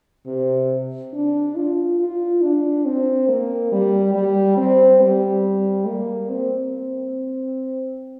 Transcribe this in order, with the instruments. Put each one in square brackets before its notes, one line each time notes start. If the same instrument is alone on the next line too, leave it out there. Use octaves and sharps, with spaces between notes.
[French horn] C3
D4
F4
F4
D4
C4
A#3
G3
G3
C4
G3
A#3
C4